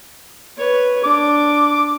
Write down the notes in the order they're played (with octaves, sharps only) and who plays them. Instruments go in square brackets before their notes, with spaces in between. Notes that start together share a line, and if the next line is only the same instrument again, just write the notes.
[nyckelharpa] B4 C#5
[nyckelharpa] D4 [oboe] D6